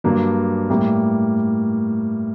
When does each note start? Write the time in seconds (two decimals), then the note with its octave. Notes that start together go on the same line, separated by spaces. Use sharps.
0.04 G2 F#3 A#3 D4
0.70 A2 G3 A#3